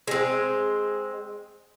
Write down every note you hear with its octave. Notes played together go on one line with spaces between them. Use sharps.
G#3 C4